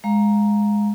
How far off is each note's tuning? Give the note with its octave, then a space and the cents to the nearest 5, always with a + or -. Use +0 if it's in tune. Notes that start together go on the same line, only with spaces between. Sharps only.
G#3 +0 F5 +0 A#5 +0